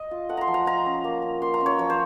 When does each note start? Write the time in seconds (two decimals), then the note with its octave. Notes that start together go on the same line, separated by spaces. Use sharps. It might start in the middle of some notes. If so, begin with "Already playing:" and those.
Already playing: D#5
0.11 F4
0.29 A3 F#5
0.37 A#5 C6
0.47 F3
0.54 A#5
0.66 F4 A#5
0.86 C#4
1.04 A#3
1.22 C#4
1.42 A#3 C6
1.54 A#5
1.61 C#4
1.66 C#5
1.78 F3 C#5
1.90 C5